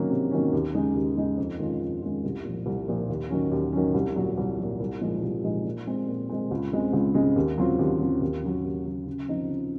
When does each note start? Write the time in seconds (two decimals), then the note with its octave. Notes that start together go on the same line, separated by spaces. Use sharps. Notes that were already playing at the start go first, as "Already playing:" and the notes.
Already playing: C3 D#3 F#3 A#3 C#4
0.10 C3
0.31 D#3 F#3 A#3 C#4
0.53 D#2
0.74 C#3 G#3 D#4
0.95 D#2
1.17 C#3 G#3 D#4
1.38 F2
1.59 D#3 G#3 C#4 F4
1.80 F2
2.02 D#3 G#3 C#4 F4
2.24 C2
2.45 A#2 F3
2.66 C2
2.88 A#2 F3
3.09 D#2
3.30 D#3 F#3 C#4
3.52 D#2
3.72 D#3 F#3 C#4
3.94 C2
4.16 A#2 F#3
4.38 C2
4.59 A#2 F#3
4.80 C2
5.01 A#2 F3 G#3 D#4
5.23 C2
5.43 A#2 F3 G#3 D#4
5.65 A#2
5.87 G#3 C4
6.08 A#2
6.29 G#3 C4
6.51 C#2
6.72 C#3 G#3 C4
6.93 C#2
7.14 C#3 G#3 C4
7.36 D#2
7.57 C#3 F#3 C4 F4
7.79 D#2
8.00 C#3 F#3 C4 F4
8.22 D#2
8.43 C#3 F#3
8.64 D#2
8.86 C#3 F#3
9.07 C#3
9.28 F3 C4 D#4
9.49 C#3